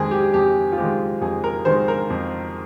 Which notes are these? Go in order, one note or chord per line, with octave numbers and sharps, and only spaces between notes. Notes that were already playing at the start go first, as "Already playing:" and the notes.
Already playing: F2 D#3 G#3 C4 G#4
G4
F2 G4
F4
D#3 G#3 C4 G4
F2 G#4
A#4
D#3 G#3 C4 C5
A#4
F2